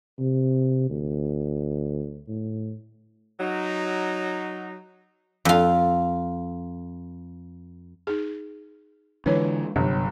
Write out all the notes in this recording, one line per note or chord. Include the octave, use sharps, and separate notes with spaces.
C3
D2
A2
F#3 D#4
F2 F4
D#4 G#4
D3 E3 G#3 D4 B4 C#5
G1 C3 F#3